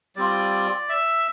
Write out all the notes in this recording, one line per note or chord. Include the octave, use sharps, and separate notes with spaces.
G3 C4 F4 D5
E5